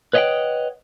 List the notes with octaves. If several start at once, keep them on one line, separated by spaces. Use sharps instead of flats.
B4 C#5 D#5 E5 F#5 G5